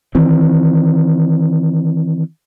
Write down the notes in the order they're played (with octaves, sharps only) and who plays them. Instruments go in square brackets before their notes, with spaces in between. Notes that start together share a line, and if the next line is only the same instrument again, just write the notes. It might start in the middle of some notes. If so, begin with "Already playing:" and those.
[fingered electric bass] D#3 E3 C4